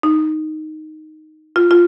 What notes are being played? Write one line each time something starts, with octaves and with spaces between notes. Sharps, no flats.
D#4
F4
F4